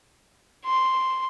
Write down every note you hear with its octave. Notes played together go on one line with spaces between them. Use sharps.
C6